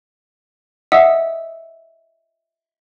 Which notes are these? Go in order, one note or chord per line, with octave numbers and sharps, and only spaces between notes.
D#5 E5 F#5 D#6 E6